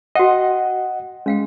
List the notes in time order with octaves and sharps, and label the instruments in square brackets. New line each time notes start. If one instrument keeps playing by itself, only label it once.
[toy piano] F#4 G5 [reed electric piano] D#5 F#5
[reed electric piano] G#3 [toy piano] C#4 F5 G5